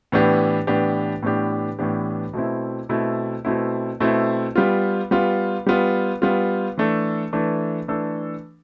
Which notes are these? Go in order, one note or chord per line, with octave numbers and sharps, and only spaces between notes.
A2 E3 B3 D4 G4
A2 E3 B3 D4 G4
A2 E3 B3 D4 G4
A2 E3 B3 D4 G4
B2 A3 C4 E4
B2 A3 C4 E4
B2 A3 C4 E4
B2 A3 C4 E4
G3 B3 F4
G3 B3 F4
G3 B3 F4
G3 B3 F4
E3 A3 D4 A4
E3 A3 D4 A4
E3 A3 D4 A4